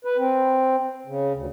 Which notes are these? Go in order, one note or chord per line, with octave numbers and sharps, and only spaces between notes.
B4
C4
C#3
D2